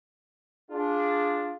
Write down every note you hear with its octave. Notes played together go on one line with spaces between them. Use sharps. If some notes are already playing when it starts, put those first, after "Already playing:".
D4 F4 G#4